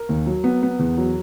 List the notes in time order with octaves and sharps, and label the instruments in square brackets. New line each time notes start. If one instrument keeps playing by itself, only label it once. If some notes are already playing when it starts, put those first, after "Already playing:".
Already playing: [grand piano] A#4
D#2
F#3
B3
B3
E2
F#3